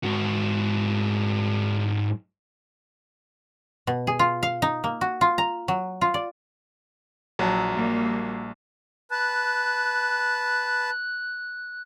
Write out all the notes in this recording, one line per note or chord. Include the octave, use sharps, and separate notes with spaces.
G#2 F#4
B2
G#4
F4
F5
D#4
A#3
F#4
F4
A#5
F#3
F4
D5
A#1 F#3 A5
G3 A#3
B4 A5 F#6